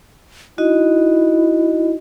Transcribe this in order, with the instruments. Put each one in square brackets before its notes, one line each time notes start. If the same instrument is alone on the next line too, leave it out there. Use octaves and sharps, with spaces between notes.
[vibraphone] D#4 F#4 D#5 [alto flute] E4